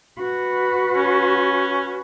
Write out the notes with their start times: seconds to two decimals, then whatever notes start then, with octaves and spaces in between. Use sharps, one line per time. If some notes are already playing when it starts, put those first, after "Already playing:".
0.20 F#4 B4
0.96 C#4